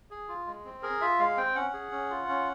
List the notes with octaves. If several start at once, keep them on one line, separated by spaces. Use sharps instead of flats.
G#4
F4
G#3
C4
G#4 A#4
F4 E5
G#3 F5
C4 G5
C#4 F#5
G#4
C#4
F4
C#4